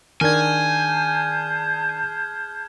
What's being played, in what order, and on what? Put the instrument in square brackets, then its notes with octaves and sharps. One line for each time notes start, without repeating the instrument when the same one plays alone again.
[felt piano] D#3 D4 [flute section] G#4 A5 G6 [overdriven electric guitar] G#5 [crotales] F6 G#6